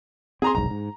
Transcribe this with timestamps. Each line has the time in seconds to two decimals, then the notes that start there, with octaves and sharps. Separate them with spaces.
0.42 C4 G#4 A#5 C6
0.55 F1 B1 G#2 A#5
0.70 G#2